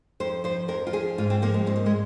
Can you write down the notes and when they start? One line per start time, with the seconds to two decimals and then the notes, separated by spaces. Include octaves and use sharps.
0.20 F2 C5
0.44 F3 C5
0.68 F2 A#4
0.87 F4
0.93 F3 G#4
1.18 G#2 F4
1.30 C4
1.42 F3 A#3
1.54 G#3
1.67 G#2 C4
1.76 A#3
1.86 G#3